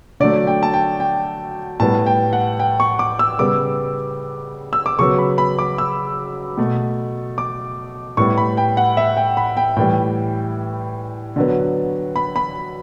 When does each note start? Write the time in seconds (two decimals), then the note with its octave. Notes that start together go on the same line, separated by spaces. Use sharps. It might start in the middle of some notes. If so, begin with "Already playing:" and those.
0.20 D3 F#3 A3 D5
0.47 G5
0.63 A5
0.74 G5
1.00 G5
1.80 A2 G3 B3 A5
2.06 G5
2.33 F#5
2.60 G5
2.80 C#6
2.99 D6
3.19 E6
3.39 C#3 G3 B3 D6
4.73 E6
4.86 D6
4.99 C#3 F#3 B3 C#6
5.18 B5
5.38 B5
5.59 D6
5.78 E6
6.57 B2 A3
7.38 D6
8.17 A2 G3 B3 C#6
8.38 B5
8.57 G5
8.77 F#5
8.97 E5
9.17 G5
9.37 B5
9.57 G5
9.76 A2 E3 G3 G5
11.36 D3 F#3 B3
12.16 B5
12.36 B5